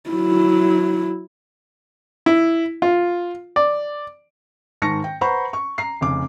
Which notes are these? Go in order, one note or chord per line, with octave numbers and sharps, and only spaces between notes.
F#3 E4
E4
F4
D5
G#2 D#3 A5 C#6 A#6 C#7
G5
B4 C5 F#5 A#5 B5 C#6
C#6
A#5 C7
F1 C#3 D6